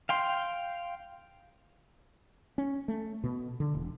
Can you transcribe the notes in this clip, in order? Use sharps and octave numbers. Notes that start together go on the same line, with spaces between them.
F5 G5 C6
C#4
A3
B2
D3
E1